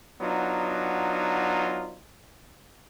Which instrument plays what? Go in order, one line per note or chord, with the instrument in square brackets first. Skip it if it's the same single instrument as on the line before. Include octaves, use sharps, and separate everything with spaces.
[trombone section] F#3 B3 D4 D#4 F4